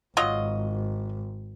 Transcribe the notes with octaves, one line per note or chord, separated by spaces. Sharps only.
G#1 F#3 F4 D#5